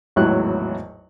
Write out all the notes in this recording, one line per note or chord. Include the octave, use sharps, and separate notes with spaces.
G#1 E2 A2 F#3 E4 F#6